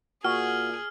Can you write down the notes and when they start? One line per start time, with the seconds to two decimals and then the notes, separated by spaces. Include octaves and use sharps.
0.24 A#2 F#4 G#4 F6